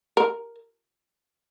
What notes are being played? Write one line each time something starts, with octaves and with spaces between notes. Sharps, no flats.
A#4